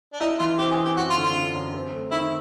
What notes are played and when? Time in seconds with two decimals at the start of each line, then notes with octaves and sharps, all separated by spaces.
0.13 D4
0.20 D#4 E4
0.39 E3 F4
0.59 C4 G4
0.71 G#4
0.78 C4
0.85 G4
0.97 F#2 F#4
1.10 F4
1.16 D3
1.22 F4
1.36 D3
1.55 F#2
1.74 C4
1.93 A3
2.12 D#3 E4